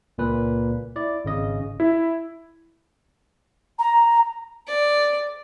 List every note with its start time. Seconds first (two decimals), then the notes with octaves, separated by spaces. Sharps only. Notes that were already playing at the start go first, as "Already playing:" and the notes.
0.18 C#2 A#2 A#3 B4
0.96 E4 D5
1.25 G#1 C#3 D#5
1.80 E4
3.79 A#5
4.67 D5